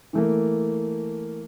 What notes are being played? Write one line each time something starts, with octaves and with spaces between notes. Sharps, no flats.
E3 A3 A#3